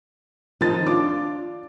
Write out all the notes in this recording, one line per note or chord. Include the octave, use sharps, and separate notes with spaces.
D#3 F3 D#4 A6
D4 F4 D6